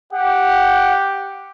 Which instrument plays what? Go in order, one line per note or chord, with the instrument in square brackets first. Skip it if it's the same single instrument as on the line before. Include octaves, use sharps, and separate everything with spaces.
[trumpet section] G4 [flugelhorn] F#5